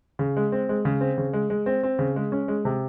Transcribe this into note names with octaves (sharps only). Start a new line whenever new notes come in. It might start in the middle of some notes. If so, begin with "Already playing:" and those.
C#3
G#3
C4
G#3
C#3
C4
C#3
G#3
G#3
C4
C4
C#3
G#3
C#4
G#3
C3